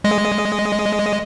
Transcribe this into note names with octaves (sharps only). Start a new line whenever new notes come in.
G#3 D#5